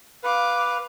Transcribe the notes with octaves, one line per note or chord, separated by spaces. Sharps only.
B4 F5 D6